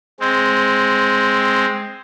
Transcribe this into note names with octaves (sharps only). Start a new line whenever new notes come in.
G#3 C4